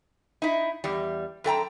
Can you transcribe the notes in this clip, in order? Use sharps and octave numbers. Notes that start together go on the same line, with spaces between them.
D#4 E4
E2 G3
F#2 A4 G5 A#5